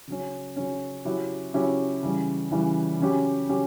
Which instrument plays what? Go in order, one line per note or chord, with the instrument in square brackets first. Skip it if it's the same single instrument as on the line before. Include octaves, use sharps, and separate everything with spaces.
[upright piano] C#3 F#3 C#4
C#3 F#3 C#4
C#3 F#3 C#4 E4 G4
C#3 F#3 C#4 E4 G4
C#3 E3 G3
C#3 E3 G3
C#3 F#3 C#4 G4
C#3 F#3 C#4 G4